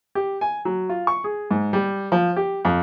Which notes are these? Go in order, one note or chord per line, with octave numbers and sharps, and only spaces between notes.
G4
G#5
F#3
F4
C#6
G#4
G#2
G3
F3
G4
F2